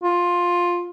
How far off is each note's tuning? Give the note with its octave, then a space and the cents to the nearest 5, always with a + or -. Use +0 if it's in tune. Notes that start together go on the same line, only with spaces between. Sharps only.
F4 +10